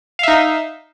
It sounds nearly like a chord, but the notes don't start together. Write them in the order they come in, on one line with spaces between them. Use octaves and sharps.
F5 E5 D#4